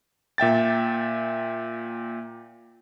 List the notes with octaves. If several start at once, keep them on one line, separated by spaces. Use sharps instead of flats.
A#2 E5 G5 A6